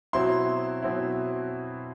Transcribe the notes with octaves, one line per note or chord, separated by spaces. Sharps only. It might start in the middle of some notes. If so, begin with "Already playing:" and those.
B2 F#3 C4 E4 C6
B2 F#3 C4 E4